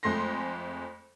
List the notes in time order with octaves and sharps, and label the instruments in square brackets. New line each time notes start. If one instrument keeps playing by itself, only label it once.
[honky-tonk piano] F2 G#3 A3 C6 A#6